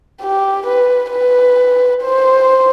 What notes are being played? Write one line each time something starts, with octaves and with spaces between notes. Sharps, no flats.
G4
B4
B4
C5